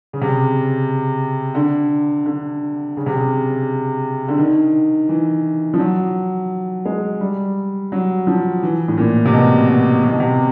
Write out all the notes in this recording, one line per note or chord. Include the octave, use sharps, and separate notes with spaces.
C#3
C3
C#3
D3
D3
C#3
C3
C#3
D3
D#3
E3
F3
F#3
G#3
G3
F#3
F3
E3
A2
A#2
C3
B2
B2
C3
B2
C3